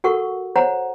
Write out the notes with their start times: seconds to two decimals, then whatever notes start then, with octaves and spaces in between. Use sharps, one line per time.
0.04 F#4 A4 A#4 F#5 C#6
0.56 C5 C#5 F#5 A#5